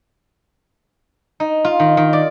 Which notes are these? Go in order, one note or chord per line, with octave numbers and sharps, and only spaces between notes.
D#4
F4
D#3
D#3
D5